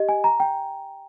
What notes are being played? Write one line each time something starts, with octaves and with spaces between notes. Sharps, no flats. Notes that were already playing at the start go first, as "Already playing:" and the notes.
Already playing: G4 D#5
G#5
A#5
G5